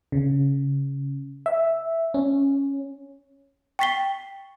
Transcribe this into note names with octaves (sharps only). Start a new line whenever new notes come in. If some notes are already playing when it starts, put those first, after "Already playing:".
C#3
E5
C#4
G5 C#6 A6 B6 C7 G7